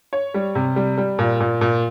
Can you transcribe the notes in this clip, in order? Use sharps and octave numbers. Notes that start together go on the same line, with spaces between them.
C#5
G3
C3
G3
G3
A#2
A#2
A#2